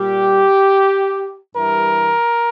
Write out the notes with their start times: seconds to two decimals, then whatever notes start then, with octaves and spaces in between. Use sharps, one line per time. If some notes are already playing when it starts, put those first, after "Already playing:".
Already playing: A#2 G3 G4
1.54 G2 E3 G3 A#4